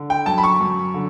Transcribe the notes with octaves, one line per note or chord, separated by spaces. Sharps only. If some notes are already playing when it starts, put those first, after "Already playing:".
Already playing: D3
G5
F#2 A5
B5
C#6
F#2
D3